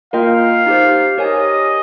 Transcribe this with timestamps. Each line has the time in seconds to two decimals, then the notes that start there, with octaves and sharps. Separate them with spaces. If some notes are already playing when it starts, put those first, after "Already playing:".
0.13 A#3 F4 A#4 D#5 F5 G5
0.66 D#4 G4 C5
1.18 G4 A#4 C#5 D#5 G#5